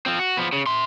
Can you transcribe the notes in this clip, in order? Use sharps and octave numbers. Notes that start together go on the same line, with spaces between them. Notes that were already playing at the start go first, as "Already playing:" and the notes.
F3 C4
F#4
F3 B3
C#3
E5 C6